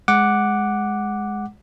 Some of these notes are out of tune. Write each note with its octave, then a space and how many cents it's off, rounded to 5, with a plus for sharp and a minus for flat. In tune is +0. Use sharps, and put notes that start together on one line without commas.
G#3 +0 F#5 +0 D6 +0